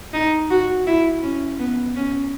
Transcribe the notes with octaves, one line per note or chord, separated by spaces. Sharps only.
D#4
F#4
E4
C#4
B3
C#4